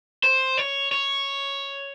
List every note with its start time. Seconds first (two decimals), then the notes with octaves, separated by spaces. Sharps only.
0.24 C5
0.58 C#5
0.92 C#5